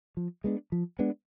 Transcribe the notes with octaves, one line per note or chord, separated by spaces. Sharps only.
F3
G#3 B3 D4
F3
G#3 B3 D4